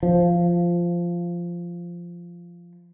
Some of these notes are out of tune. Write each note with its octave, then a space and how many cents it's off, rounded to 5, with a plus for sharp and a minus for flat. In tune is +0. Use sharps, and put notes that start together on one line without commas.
F3 -10